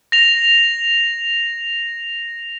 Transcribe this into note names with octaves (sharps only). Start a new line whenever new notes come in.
A#6 F7